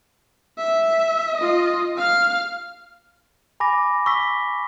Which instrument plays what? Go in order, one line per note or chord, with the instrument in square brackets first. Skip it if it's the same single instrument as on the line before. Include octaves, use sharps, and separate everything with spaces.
[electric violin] E5
F4 D#5
F5 F6
[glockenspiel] G#5 B5 D6 A#6
C#6 E6 B6